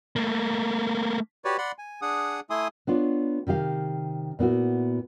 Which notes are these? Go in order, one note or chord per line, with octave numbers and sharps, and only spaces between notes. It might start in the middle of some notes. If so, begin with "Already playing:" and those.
A3 A#3
F#4 G4 B4 C#5 D5
D5 F#5 B5 C6
G#5
D4 G#4 F#5 D#6
A3 E4 G#5 C6 D#6
B3 D4 F4 C#5
C3 D#3 G4 F5
A#2 B3 E4 F#4